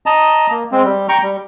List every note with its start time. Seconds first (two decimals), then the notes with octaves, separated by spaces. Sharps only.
0.06 D#5 A5 A#5
0.51 A#3
0.72 G#3 C4
0.85 G3
1.09 G5 A#5 C#6
1.22 G3